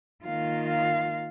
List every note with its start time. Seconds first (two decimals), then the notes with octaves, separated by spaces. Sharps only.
0.24 D#3 A#3 F4 F5
0.68 F5